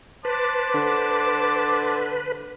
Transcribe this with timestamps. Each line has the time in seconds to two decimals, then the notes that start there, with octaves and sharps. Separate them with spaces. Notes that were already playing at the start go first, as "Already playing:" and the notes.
0.25 B4 C5 A5 D6
0.74 D3